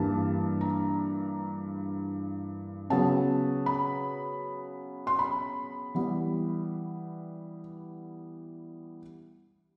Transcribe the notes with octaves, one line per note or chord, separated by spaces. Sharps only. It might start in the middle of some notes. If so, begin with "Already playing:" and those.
Already playing: G2 E3 G3 A#3 A5
A#5
C#3 F#3 B3 A5
B5
C6
B5
E3 G3 B3